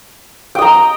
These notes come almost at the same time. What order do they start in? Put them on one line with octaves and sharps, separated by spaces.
G5 D#5 A#5